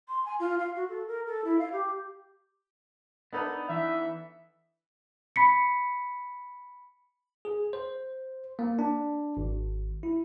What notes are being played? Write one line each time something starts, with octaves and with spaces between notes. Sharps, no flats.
C6
G#5
F4
F5
F#4
A4
A#4
A4
E4
F5
G4
B3 D4 D#4 A4 B4
E3 E5
B5 B6 C#7
G#4
C5
A#3
D4
G#1
E4